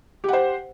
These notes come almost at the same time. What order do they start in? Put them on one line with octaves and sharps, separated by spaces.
G4 F#5 C5